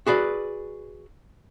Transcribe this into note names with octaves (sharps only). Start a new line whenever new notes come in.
F#4 G#4 B4 D5